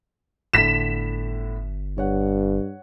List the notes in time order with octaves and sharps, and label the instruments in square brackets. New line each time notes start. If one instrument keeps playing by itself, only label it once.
[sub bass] G1 [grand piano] A2 D3 [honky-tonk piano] B6 E7
[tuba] G2 [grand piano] C#5 F#5